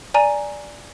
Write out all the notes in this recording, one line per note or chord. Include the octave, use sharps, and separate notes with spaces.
D5 G#5 A#5 D#7